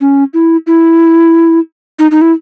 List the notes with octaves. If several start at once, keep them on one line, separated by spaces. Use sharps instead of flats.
C#4
E4
E4
D#4
D#4
E4